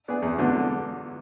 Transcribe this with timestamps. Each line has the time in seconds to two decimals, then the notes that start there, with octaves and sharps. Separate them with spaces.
0.08 B3 D4 G#4
0.22 E2
0.38 D3 F#3 B3